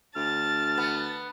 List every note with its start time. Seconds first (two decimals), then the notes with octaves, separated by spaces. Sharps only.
0.16 D2 A5 F6 A6
0.78 B3